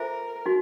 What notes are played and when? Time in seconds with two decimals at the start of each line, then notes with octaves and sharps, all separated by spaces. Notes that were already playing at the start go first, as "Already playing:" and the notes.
Already playing: F4 A4 A#4 C5 E5 G#5
0.46 D#4 F#4